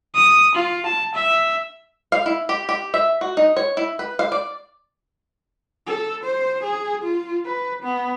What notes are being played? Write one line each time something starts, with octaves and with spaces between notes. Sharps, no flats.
D#6
F4
A5
E5
F5
E4
G4
G4
E5
F#4
D#4
C#5
E4
B4
F5
D5
A4
C5
G#4
F4
B4
B3